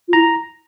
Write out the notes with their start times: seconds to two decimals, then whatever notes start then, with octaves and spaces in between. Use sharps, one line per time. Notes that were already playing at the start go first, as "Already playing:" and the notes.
0.08 F4
0.13 E4 A#5